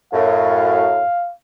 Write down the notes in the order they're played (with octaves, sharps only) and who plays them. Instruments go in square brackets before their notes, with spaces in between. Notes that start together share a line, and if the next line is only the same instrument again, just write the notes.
[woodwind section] F#2 A2 [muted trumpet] F5